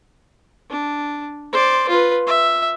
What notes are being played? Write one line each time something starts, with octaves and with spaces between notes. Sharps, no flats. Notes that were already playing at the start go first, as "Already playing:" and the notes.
D4
C5 D5
F4 B4
E5